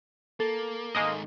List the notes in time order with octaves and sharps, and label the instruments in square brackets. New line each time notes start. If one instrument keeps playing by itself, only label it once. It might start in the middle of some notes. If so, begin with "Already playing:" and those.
[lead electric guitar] A#3 [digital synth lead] A4
[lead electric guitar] G#2 D#3 [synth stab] G#3 A#3 D#5